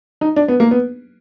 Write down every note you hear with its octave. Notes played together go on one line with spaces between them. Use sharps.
D#4
D4
B3
A#3
B3